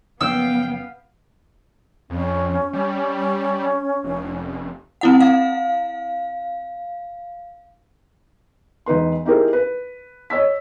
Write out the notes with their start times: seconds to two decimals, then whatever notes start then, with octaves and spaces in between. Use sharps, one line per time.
0.21 F#1 F3 B3 C#4 F5 G5 E6
2.10 F2 C#4
2.73 G3
4.04 F1
5.01 C4 E4 F#5
5.20 F5
8.86 E1 D#4 B4 C6
9.25 D#4 E4 G4 G#4 A#4 C5
9.53 B4
10.30 C#5 D#5 E6 B6